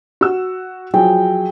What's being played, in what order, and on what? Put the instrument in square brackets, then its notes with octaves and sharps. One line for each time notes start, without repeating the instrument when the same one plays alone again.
[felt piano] F#4 E6
[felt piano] F3 F#3 [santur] G#4 G5